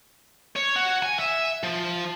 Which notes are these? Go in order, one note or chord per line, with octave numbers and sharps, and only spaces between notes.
C#5
F#4
G#5
E5
F3